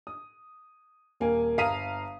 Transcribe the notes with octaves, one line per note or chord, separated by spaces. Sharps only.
D#6
D#1 A#3 G#5
G1 F5 A#5 D#6 B6 D#7